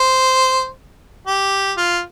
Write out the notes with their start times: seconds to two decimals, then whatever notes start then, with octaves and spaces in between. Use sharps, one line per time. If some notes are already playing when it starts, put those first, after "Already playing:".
Already playing: C5
1.27 G4
1.77 F4